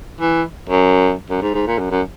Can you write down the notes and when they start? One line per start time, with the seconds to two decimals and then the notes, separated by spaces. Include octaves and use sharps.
0.21 E3
0.69 F#2
1.30 F#2
1.42 G#2
1.54 G#2
1.67 A#2
1.79 F#2
1.91 F#2